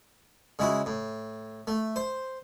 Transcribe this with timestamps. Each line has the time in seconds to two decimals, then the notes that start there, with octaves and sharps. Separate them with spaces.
0.59 C#3 G#3 E4 F#4
0.86 A2
1.67 A3
1.96 C5